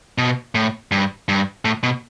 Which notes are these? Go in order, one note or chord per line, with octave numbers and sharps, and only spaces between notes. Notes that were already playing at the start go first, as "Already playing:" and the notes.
B2
A2
G2
G2
A2
B2